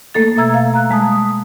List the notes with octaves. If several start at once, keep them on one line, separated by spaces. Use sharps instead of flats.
A3 A#3 A4 A6
B2 E5 A#5 E6 G#6
F5
A#5 F#6
G3 G#3 A5 D#6
D#6